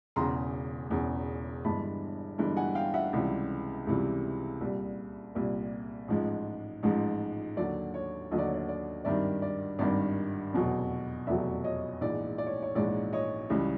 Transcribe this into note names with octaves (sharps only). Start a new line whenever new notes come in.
E1 E2 C#3 A#5 C6
E1 E2 C#3
G1 G2 E3 G#3 A5 B5
G1 G2 E3 G#3
F#5 G#5
F5 G5
E5 F#5
C#2 C3 E3 G3
C#2 C3 E3 G3
C2 A#2 G3
C2 A#2 G3
A1 G#2 F3 G#3
A1 G#2 F3 G#3
D#2 D3 F#3 D5
C#5
D#2 D3 F#3 D#5
D5
C#5
D5
D5
G#1 G2 D#3 G3 D5 E5
D5
G#1 G2 D#3 G3 D5
F1 E2 B2 F#3
F1 E2 B2 F#3 D5 E5
C#5 D#5
A#1 G#2 E3 G#3 D5
D5
C#5
C#5
A#1 G#2 E3 G#3 D5
C#5 D#5
C#2 C#3 E3 G3